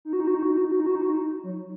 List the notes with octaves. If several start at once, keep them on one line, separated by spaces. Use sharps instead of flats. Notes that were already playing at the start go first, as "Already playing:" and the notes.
D#4
F#4
D#4
F#4
D#4
F#4
D#4
F#4
D#4
F#4
D#4
F#4
D#4
F#4
D#4
F#3